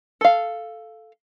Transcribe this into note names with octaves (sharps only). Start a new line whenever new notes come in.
A4 F5